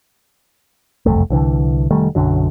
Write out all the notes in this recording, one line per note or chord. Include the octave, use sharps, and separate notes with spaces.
F#1 C2 F2 A3
C2 D3 E3
F1 D#3 G3 A3
B1 F#2 D3 F#3